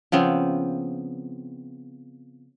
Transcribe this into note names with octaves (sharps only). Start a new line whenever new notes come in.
C#3 F3 B3 C4